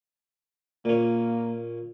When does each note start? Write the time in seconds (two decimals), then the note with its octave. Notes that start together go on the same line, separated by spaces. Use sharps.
0.85 A#2 A#3 C#4